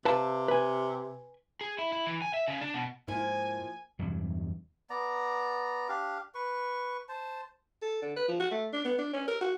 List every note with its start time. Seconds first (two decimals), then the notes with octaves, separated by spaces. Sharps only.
0.05 C3 B4 F5 A5
0.48 B4 G#5
1.61 G#4
1.79 E4
1.92 E4
2.06 E3
2.22 G#5
2.34 E5
2.48 C#3
2.61 D4
2.74 B2
3.08 G#2 F3 A#3 E4 G#5
3.99 E2 G2 C3 F#3
4.90 B3 D5 A#5
5.89 D4 G4 F5
6.34 B4 C#6
7.09 C5 A5
7.82 A4
8.02 D3
8.16 B4
8.28 F3
8.40 F#4
8.51 A3
8.73 D4
8.84 B3
8.98 D4
9.13 C#4
9.28 A#4
9.41 F#4